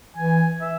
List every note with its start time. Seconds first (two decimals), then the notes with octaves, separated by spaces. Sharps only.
0.16 E3 G#5
0.62 E5